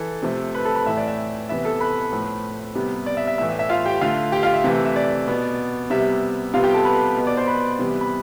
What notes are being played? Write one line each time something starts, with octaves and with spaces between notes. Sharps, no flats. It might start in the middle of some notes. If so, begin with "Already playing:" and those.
Already playing: E3 A4 A5
C3 F3 A3
B4 B5
A4 A5
B4 B5
A2 E3 A3 E5
D5
E5
C3 E3 B3 E5
A4 A5
B4 B5
A2 F3 A3
C3 G3 B3
D5
E5
E5
A2 E3 A3 E5
E5
E5
F4 F5
G4 G5
D3 A3 F4 F5
G4 G5
F4 F5
E5
C3 E3 A3
E5
D5
B2 B3
C3 G3 B3 E5
C3 G3 B3 F4 F5
G4 G5
A4 A5
B4 B5
B2 B3
D5 D6
C5 C6
B4 B5
C3 E3 G3 B3
B5